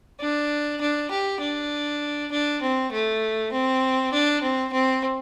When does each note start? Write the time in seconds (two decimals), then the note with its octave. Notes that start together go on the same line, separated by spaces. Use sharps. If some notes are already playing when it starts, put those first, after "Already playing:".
0.21 D4
0.81 D4
1.11 G4
1.41 D4
2.32 D4
2.62 C4
2.92 A3
3.52 C4
4.13 D4
4.42 C4
4.72 C4